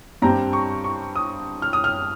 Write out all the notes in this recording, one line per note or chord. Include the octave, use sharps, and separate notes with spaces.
G2 G3 C4 A#5
C#6
C#6
D#6
F6
D#6
F6